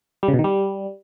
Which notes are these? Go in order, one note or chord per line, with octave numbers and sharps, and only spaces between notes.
G3
C#3
B2
D#3
G3